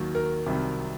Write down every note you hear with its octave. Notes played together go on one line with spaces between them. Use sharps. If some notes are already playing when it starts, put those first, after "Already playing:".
Already playing: D#2 D#3 F#3
A#4
C2 C3 D#3 F#3